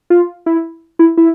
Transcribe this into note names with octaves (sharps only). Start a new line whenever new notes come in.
F4
E4
E4
E4